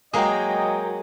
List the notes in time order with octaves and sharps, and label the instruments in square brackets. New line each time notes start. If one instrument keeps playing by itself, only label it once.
[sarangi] F#3 [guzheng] G#3 A#3 [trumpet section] D#5 [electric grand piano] G5 A#5 D#6